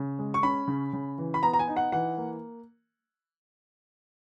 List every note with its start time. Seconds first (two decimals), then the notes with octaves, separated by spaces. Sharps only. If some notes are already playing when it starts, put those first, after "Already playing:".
Already playing: C#3
0.19 G#3
0.34 C#6
0.43 C#4 B5
0.68 C#3
0.93 C#3
1.18 E3
1.34 B5
1.43 B3 A#5
1.53 A#5
1.59 G#5
1.68 D#4
1.76 F#5
1.92 E3 F#5
2.18 A#3